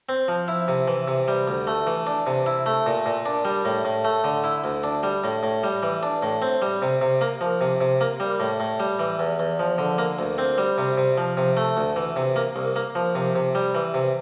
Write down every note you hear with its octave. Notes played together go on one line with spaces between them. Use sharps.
C4
F3
E4
C3
E3
C3
G3
D2
A3
E3
D4
C3
E4
A3
A#2
A#2
D4
G3
A2
A2
A3
D3
E4
D2
D4
G3
A2
A2
G3
E3
D4
A2
C4
G3
C3
C3
A#3
F3
C3
C3
A#3
G3
A2
A2
G3
E3
E2
E2
F3
D3
A#3
D2
C4
G3
C3
C3
F3
C3
A3
D2
E3
C3
A#3
C2
A#3
F3
C3
C3
G3
E3
C3